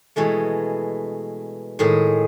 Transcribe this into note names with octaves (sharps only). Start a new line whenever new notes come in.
B2 E3 G#3 A3
A2 D#3 G#3 G#4